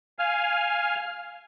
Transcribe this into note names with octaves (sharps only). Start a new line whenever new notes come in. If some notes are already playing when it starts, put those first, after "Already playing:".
F5 G#5 F6